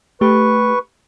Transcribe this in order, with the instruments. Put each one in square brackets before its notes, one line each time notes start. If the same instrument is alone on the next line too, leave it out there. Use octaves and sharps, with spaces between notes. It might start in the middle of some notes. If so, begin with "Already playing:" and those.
[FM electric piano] A3 G4 [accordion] B4 C#6